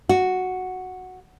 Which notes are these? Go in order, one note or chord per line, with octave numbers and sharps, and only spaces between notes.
F#4